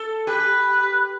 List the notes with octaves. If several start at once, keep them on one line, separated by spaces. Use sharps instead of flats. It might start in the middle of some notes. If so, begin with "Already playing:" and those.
Already playing: A4
G4 B4